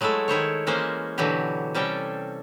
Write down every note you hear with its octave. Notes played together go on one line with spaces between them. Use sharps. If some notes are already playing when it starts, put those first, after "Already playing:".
F#3 G#3 A3 E4 A4
D#3 E4 C5 C#5
E3 G#3 A#3 C#4 C5
B2 D3 E3 F#3 F#4 G4
C3 G3 C#4 A4 G5